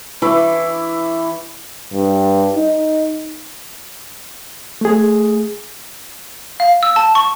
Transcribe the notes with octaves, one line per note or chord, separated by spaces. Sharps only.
E3 E4 C#6 D6
G2
D#4
A3 G#4
F5
E6
A5
C#6